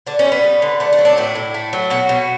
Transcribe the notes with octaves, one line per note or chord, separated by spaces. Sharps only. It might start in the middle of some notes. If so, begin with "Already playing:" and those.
D3 D4
C#4
G3
B3
G3
D3
A3 D4
D4
F#3
D4
A2 E4
A2
A3
F#3
B2 F#4
B2